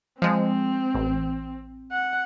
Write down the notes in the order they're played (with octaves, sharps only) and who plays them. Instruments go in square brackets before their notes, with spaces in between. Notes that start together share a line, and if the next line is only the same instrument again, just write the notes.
[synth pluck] F3 G#3 [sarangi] C4
[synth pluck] A1
[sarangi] F#5